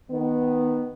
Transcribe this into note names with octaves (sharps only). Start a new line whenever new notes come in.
D#3 B3